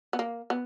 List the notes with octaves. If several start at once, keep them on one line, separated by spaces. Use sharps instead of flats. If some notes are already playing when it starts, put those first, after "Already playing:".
B3
A#3
B3